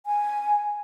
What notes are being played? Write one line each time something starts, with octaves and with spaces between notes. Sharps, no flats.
G#5